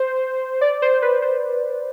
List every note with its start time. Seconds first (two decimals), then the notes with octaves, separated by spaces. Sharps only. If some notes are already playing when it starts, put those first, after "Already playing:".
Already playing: C5
0.61 D5
0.82 C5
1.02 B4
1.22 C5